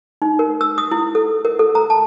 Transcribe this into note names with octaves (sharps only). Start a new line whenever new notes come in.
D#4
A#4
E6
D#6
E4
A4
A#4
A4
A#5
A5